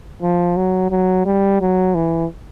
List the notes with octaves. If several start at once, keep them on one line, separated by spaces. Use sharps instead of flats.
F3
F#3
F#3
G3
F#3
E3